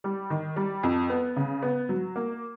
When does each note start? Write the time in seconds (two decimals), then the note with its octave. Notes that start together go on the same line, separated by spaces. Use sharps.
0.04 G3
0.30 D#3
0.56 G3
0.83 F2
1.10 B3
1.36 C#3
1.63 B3
1.89 F#3
2.16 A#3